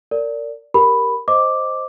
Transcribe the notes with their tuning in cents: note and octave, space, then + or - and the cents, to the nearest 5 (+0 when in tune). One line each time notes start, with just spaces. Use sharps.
A#4 -30 D5 -15
G4 +10 A#4 +0 B5 +0
C5 +0 D#5 +0 D6 +0